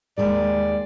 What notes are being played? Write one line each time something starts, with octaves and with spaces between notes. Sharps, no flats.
D#2 G#3 A#4 D5